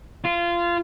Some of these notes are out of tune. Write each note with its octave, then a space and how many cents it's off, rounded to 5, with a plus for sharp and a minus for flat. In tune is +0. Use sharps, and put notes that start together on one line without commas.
F4 -20